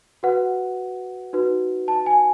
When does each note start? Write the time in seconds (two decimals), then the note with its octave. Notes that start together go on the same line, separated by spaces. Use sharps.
0.23 F#4 B4 F#5
1.33 D#4 F#4 B4
1.88 A5
2.06 G#5